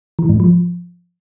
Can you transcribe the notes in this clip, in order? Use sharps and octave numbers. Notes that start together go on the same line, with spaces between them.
E3
G#2
F3